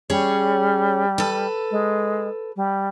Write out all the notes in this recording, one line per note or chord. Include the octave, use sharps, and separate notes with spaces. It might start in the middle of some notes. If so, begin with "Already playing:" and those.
G3 C#4 G#4 C#5
A4 B4
G#3
G3